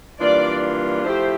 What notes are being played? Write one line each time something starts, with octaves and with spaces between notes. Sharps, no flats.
E3 G3 A#3 D4 F4 D5
F3 A3 E4 G4 C5